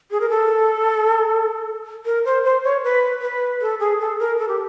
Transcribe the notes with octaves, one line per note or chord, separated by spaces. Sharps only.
G#4
A#4
A4
A#4
C5
C5
C#5
B4
B4
A4
G#4
A4
A#4
A4
G4